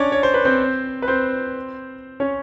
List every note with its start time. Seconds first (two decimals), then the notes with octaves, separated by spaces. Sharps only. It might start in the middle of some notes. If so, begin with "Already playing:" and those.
Already playing: C#4 D4 C#5 D5
0.12 C#5
0.23 C5
0.34 B4
0.45 C4 C5
1.02 B4
1.08 C4 C5
2.20 C#4 C#5